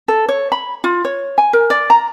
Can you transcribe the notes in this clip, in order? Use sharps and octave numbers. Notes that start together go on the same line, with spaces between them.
A4
C#5
B5
F4
C#5
G#5
A#4
D5
A#5